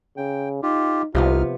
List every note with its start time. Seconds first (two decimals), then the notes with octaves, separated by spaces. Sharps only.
0.17 C#3 G5
0.63 D#4 F4 G4
1.15 C2 C3 F3 B3 D#4 F4 F6